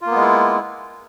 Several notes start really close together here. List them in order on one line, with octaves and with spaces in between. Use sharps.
F4 A#3 B3 G#3 E4